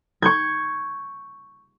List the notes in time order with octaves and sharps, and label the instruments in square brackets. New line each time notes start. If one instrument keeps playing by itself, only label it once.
[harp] C#6 G6 G#6